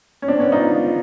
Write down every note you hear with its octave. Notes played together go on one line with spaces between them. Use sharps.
C#4
C4 D4
B3 C#4
D#4 F4